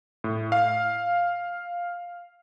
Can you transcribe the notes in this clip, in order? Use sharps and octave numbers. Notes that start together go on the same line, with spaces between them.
A2
F5